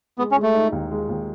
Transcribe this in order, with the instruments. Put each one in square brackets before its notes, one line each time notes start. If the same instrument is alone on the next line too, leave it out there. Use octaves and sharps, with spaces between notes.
[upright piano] G#3 [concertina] B3
[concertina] C#4
[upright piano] G#3
[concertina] A3
[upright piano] D#4
D#2
G#3
D#2